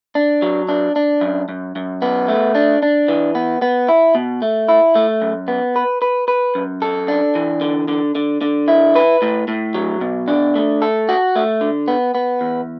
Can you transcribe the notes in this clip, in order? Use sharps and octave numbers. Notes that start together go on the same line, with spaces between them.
D4
F#3
D4
D4
F#2
F#2
F#2
B3
A3
D4
D4
E3
B3
B3
E4
B2
A3
E4
A3
F#2
B3
B4
B4
B4
F#2
A4
D4
E3
D3
D3
D3
D3
E4
B4
A2
A2
F#3
B2
D4
A3
A4
F#4
A3
D3
B3
B3
E2